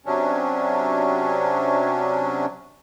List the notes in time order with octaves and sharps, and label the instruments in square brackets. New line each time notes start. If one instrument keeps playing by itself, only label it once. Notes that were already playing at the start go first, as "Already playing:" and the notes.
[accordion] C3 F#3 C#4 D4